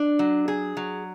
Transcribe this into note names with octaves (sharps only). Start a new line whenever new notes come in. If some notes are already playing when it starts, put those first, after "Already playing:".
Already playing: D4
F#3
G#4
F#3